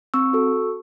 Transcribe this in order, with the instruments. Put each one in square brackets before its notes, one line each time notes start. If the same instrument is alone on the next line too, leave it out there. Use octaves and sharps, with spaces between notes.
[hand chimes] C4 C#6 E6
F#4 A4